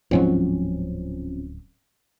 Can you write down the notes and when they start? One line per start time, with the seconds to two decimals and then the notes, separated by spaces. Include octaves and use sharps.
0.11 D1 G#2 F3 F#3 C4 C#4